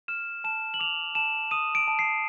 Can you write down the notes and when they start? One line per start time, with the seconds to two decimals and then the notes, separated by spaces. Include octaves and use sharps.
0.08 F6 E7
0.44 A5 E7
0.74 F#7
0.80 D6 F7
1.15 A5 E7
1.51 D#6 D#7
1.75 D7
1.88 A5
1.99 C7